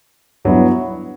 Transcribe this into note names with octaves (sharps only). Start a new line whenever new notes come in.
G2 F#3 B3 E4